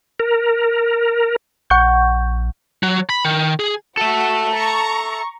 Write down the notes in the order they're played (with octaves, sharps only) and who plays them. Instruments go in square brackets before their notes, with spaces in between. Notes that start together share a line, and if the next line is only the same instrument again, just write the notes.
[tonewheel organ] A#4
[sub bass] A#1 [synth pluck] F#5 C#6 G6
[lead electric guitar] F#3
B5
D#3
G#4
[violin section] F#4 [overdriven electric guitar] A4 E5 [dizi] A5
[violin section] A#5 C#6